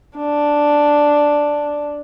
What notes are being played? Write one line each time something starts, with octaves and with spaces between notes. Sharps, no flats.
D4